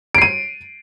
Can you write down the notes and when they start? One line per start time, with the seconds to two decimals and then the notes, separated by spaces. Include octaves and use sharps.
0.15 D7
0.18 C7
0.22 D#7